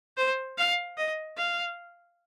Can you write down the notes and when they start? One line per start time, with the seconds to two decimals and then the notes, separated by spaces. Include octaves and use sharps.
0.17 C5
0.58 F5
0.97 D#5
1.37 F5